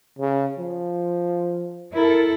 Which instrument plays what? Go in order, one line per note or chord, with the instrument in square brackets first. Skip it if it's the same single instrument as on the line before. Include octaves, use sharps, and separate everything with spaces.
[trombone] C#3
F3
[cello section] E4 A4 [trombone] A#4